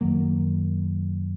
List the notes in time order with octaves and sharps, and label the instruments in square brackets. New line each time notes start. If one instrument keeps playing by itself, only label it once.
[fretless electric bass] F#2 D#3 F#3 A#3